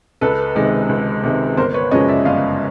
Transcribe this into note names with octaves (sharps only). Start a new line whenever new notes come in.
C#2 A4 B4
C3 D#3 G#3
C#2
C3 D#3 G#3
G1 A#4 C5
B4 C#5
F#2 C#3 F3 G#3 C#5 D#5
D5 E5
G1 D#5 F5